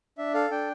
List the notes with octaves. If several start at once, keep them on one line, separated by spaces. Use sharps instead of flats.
D4 E5
A4 F5
D4 G5